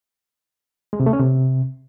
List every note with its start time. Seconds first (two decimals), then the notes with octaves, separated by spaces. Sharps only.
0.93 G#3
1.00 C3
1.06 A3
1.13 C#4
1.20 C3